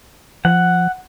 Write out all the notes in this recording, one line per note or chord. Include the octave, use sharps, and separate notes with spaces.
F3 F#5